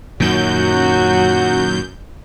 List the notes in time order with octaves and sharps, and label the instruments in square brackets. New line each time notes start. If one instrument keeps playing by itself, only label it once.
[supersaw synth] F#2 G6 [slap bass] A#2 D#3 [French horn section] F#3 F#4